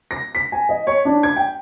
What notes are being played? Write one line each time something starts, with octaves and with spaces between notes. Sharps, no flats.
A#6
B6
G#5
D#5
C#5
D4
G#6
G5